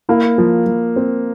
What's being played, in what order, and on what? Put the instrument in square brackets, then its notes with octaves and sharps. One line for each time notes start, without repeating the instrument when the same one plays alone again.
[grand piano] A#3 [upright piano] E4
[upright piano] F3
F3
C4